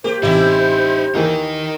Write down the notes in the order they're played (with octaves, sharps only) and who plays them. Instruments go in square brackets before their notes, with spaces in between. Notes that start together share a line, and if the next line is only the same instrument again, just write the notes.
[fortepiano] A#3 [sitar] G4 [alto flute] C5
[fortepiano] A1 C3 [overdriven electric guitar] D#4 E5 [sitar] E4 G4
[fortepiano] D#2 E3 A#3 [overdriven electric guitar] D#4 A#4